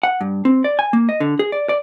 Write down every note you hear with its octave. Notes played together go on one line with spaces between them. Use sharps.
F#5
G2
C4
D5
G#5
A#3
D#5
D3
G#4
D5
D5